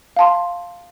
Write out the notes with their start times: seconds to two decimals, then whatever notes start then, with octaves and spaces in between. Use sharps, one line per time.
0.16 F5 A5 C6